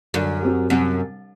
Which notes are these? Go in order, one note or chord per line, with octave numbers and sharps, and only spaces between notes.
F#2 D3
F#3 C4 G4
F#2 C3